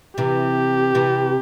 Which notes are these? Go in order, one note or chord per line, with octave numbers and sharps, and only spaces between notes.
C3 E3 G4
C3 E3